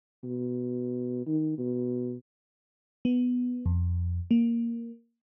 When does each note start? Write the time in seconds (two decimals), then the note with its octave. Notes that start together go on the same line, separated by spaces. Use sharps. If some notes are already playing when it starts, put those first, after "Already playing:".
0.24 B2
1.26 D#3
1.58 B2
3.05 B3
3.66 F2
4.31 A#3